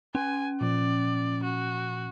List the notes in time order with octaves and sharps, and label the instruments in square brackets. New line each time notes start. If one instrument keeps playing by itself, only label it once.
[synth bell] C#4 [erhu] G#5
[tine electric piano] A#2 F3 [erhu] D5
[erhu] F#4